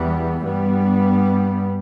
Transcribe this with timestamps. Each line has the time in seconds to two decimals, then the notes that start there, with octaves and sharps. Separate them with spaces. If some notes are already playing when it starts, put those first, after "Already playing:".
Already playing: E2 E3 G3 B3
0.42 G2 G3 B3